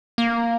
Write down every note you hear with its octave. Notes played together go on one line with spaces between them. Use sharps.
A#3